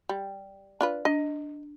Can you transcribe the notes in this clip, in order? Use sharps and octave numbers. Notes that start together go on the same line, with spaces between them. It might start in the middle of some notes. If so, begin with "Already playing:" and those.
G3
D4 F4 B4
D4 D#5